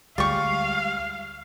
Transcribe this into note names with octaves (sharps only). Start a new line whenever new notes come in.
D2 G3 G#3 F4 G4 F5 C#6